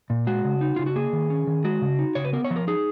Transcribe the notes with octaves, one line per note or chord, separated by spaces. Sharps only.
A#2
G#3 F#4
C#3
D#4
C#3 F4
F#4
A#3 G#4
D#3
C#4
D#3
G#3 F#4
C#3
D#4
C#3 C#5
B4
B3 A#4
C#5
F3
A#4
D#4 G#4